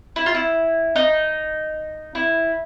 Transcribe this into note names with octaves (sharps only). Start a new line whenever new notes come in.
E4
F4
E4
D#4
E4